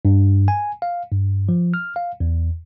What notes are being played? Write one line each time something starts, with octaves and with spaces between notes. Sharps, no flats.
G2
G#5
F5
G2
F3
F6
F5
E2